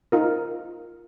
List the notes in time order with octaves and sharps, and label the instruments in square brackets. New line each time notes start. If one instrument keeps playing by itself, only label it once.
[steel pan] D#4 F4 A#4